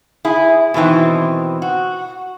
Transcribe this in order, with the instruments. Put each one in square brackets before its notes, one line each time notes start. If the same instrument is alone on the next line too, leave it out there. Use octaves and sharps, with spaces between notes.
[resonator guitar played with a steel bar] E4 G#4
B2 D#3 E3 C4
F#4